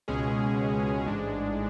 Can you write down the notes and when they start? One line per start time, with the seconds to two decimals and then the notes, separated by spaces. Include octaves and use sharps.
0.08 C#2 B2 G#3 C#4 G#4
1.06 A1 G#2 G#3 D4